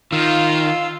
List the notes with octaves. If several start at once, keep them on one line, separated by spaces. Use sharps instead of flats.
D#3 F4 F5 E6